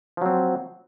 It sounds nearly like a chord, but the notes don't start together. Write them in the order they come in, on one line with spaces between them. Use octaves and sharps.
F3 F#3 C4